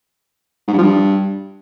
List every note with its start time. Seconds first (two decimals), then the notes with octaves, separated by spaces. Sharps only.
0.68 G#2
0.73 G2
0.78 F3
0.83 G2